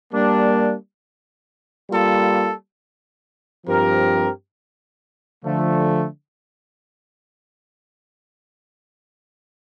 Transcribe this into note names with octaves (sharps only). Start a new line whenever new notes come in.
G3 A#3 D4
G3 A#3 F4 A4
G2 F3 C4 G4 A#4
D3 F3 A3